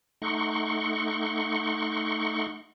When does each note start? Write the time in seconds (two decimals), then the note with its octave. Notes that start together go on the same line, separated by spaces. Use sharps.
0.22 A3 D#4 F#5 C6 C#6